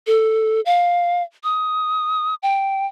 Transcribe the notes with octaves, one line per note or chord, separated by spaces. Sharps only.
A4
F5
D#6
G5